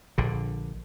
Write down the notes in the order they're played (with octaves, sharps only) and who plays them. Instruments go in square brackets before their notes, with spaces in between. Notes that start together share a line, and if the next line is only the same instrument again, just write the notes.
[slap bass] A#1 D3